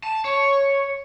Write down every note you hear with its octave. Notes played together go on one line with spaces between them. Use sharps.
A5
C#5